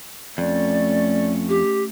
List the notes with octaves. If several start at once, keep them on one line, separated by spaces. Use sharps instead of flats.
F2 A3 C#4 D5
G4